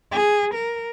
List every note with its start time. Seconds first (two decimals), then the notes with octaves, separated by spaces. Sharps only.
0.12 G#4
0.54 A#4